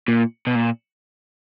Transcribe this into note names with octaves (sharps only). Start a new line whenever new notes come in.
A#2
B2
A#2